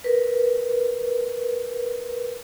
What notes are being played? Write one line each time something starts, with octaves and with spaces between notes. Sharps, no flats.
A#4 B4